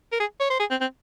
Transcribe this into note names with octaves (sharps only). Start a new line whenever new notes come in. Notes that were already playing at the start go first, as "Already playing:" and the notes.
A#4
G#4
C#5
C5
G#4
C4
C4